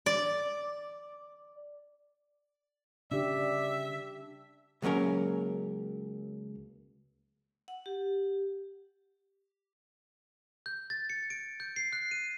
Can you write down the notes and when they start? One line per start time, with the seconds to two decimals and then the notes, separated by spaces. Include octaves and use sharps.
0.06 D5
3.12 C#3 D4 G4 D5 E5
4.82 C#2 F#3 A#3 C#4 A#4
7.68 F#5
7.86 G4
10.66 G6
10.90 A6
11.10 C#7
11.30 D7
11.60 G6
11.76 C7
11.93 F#6
12.11 D#7